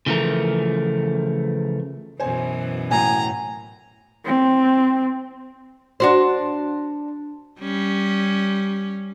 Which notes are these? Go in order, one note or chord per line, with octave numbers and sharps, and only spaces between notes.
C#3 E3 F3 A3 A#4
F#2 B2 E3 C5 G#5
A2 F#3 G#5 A#5
C4
D4 F#4 C5
G3 C#4